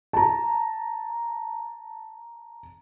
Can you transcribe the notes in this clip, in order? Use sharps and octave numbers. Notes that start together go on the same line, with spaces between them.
A5 A#5